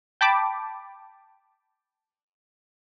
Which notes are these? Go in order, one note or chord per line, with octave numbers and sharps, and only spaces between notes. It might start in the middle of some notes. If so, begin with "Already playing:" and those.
G5 A5 B5 D6